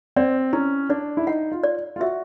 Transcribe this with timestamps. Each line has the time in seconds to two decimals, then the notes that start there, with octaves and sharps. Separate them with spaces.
0.16 C4 D5
0.53 C#4 E4
0.89 D4 D5
1.17 E4
1.27 D#4 F#5
1.52 F4
1.63 D5
1.96 F4
2.00 F#4 E5